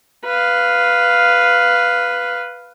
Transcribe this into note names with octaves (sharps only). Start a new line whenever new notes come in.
B4 F5